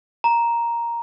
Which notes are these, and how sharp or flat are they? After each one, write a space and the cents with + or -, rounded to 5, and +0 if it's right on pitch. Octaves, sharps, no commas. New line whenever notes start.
A#5 +5